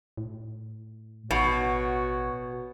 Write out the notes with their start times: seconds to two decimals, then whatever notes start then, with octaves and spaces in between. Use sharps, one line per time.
0.17 A2
1.31 A1 B2 F#4 C#5